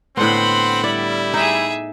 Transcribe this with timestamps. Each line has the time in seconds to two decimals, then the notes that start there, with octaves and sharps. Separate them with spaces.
0.17 A2 D3 B3 C4 F#5 B5 C6
0.84 G3 E4 D5
1.34 D#4 G#4 E5